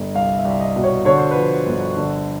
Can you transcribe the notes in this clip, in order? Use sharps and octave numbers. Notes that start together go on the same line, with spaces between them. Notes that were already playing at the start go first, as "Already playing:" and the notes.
Already playing: G1
C2 F5
E5
C2
E5
D#5
B2
C#5
D3 C#5
C5
F3 B4
C5
G1
D3